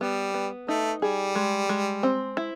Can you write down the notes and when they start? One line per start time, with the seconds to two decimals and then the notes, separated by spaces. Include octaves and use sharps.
0.01 G3 B3
0.34 B3
0.68 A3 D#4
1.02 G3 G#4
1.35 G#3
1.69 G#3
2.03 C4
2.37 E4